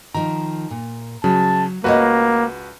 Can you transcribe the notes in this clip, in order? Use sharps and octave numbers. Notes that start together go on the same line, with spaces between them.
D#3 F3 A#5
A#2
C#3 F#3 A5
C#2 A3 A#3 F#4 B4 C#5 D#5